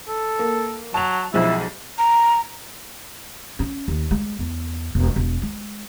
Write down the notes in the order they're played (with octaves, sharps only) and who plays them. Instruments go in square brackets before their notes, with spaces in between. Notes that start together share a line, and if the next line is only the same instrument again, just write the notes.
[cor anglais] A4
[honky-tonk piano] A#3
[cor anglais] F#3 [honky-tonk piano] A5 F7
[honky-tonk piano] B1 F3 G#3 [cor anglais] E4
[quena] A#5
[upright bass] C#4
D#2
G#3
E2
E1
E1
G#3